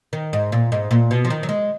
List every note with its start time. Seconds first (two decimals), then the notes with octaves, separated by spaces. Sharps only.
0.13 D#3
0.33 G#2
0.52 A#2
0.72 G#2
0.91 A#2
1.11 B2
1.25 F3
1.30 D#3
1.43 F#3
1.49 G#3